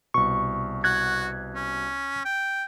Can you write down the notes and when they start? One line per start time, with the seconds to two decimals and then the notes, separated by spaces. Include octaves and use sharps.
0.14 C2 B2 C#6
0.84 F#4 F#6 G#6
1.55 C#4
2.25 G5